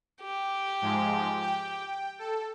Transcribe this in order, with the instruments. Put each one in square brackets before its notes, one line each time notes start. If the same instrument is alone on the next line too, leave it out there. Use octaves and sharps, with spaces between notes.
[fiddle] G4
[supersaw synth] G#2 F3 G#3
G5
A4